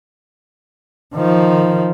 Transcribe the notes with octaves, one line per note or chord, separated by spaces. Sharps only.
D#3 F3